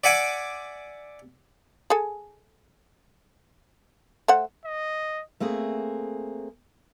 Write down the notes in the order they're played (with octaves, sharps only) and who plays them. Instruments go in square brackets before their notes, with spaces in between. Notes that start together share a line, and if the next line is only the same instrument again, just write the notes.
[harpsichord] D5 E5 F#5 G#5 D6
[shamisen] G#4 A4 G#5
A3 C5 F#5
[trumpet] D#5
[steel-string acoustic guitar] A3 A#3 C4 G#4